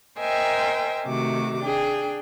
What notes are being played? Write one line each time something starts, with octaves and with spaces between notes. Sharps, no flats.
A#4 C5 D#5 E5 G5 G#5
C3 D#3 A3 F#4 D6
D4 G#4 G5